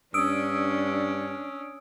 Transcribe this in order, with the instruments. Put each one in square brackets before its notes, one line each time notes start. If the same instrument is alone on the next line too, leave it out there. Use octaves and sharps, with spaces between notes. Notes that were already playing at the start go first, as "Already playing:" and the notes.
[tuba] G2 [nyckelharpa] C#4 [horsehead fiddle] D4 [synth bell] D#6 E6 D7